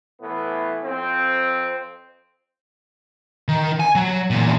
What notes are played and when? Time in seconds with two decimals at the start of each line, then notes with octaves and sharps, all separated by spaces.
0.21 A2 E3 B3
0.84 F2 C4
3.48 D#3
3.80 G#5
3.95 F#3
4.30 E2 A#2